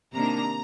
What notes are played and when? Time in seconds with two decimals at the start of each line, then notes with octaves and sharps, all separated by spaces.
0.13 C3 D#3 A#3 D4 A#5